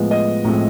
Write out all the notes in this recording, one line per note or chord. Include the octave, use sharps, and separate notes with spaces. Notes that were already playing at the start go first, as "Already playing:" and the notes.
Already playing: A2 F3 G#3 B3
D#5
A2 F3 G#3 C4